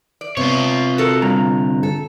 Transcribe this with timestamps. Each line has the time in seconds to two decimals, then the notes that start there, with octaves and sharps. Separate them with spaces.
0.21 D5
0.37 C3 B3 C4 F4 C#5
0.98 F#4 A4 A#4
1.22 F2 D3 G3 A#5
1.83 A4